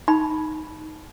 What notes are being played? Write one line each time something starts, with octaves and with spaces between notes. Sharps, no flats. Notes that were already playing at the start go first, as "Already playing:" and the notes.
D#4 B5